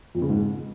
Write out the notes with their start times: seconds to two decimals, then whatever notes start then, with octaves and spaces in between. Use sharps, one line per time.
0.15 F2
0.22 C#3
0.29 G#2